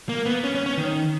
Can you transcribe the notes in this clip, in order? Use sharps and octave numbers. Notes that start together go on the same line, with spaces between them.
A#3
B3
C#4
C#4
C#4
D#3